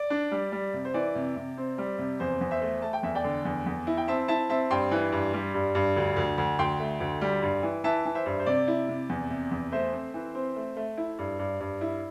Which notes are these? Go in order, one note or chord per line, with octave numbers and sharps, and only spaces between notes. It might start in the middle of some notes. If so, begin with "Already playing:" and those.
Already playing: D5
D4
G3
G3
C3
C5
E3 D5
C3
C3
C4
G3
C3
E2 C5
E2
C5 E5
A3
A3 A5
G5
E2 E5
D5 G5
D3
E2
E2
E4
G5
C4 E5 A5
E4 E5 A5
C4 E5 A5
G2 G5 C6
E3
G2
G3
G2
G2
D2
D2
D2
D2 G5 C6
A3
D2
G3
G2
E3
E3 E5 A5
E3
C5 E5
G2
C5
C3 D5
E4
C3
E2
C3
E2
A3 C5 E5
C4
E3
C4
A3
A3
E4
G2
G2
G2
E4